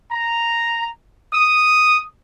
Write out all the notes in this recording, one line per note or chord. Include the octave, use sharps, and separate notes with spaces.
A#5
D#6